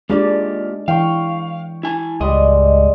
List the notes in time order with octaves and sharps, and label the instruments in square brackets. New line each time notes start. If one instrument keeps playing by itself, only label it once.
[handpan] G#3 D4 D5 [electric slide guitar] A#3 F4 G4
[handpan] E3 [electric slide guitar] F5 [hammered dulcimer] G5 C#6
[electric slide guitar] E4 G#5 A5
[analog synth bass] C#2 [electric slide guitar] G#2 D#5 [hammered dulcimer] G3 G#3